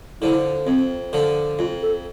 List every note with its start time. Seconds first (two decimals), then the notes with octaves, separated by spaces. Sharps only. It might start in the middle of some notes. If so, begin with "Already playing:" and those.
0.21 D3 F3 E4
0.67 F2 C4
1.13 D3 F3
1.59 F2 F4
1.82 A4